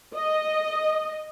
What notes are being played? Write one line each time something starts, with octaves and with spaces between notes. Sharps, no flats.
D#5